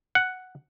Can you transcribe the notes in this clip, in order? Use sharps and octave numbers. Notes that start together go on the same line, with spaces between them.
F#5